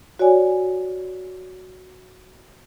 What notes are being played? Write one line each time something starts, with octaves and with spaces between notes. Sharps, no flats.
F#4 C#5 D5 G#5